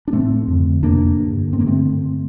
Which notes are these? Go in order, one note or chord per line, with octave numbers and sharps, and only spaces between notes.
D4
A2 A3 C4
F2 D3
F2 C3 A#3 D4
G2 D3
G2 D3 C4
A#3
A3 C4
G2 D3